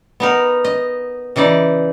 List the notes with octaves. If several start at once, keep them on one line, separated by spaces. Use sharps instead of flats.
B3 D#4 A#4
D#5
C#3 E3 D#4 D5